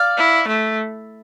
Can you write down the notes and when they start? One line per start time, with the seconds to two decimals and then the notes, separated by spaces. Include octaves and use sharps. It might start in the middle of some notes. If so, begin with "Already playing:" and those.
Already playing: D5 F5
0.17 E4
0.48 A3